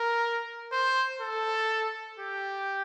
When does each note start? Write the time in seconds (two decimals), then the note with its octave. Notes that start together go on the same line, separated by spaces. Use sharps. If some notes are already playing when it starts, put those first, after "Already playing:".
Already playing: A#4
0.72 C5
1.21 A4
2.19 G4